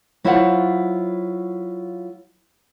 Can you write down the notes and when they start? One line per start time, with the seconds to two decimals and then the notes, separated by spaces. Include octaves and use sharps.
0.24 F#3 E4 F4 C5 F5 F#5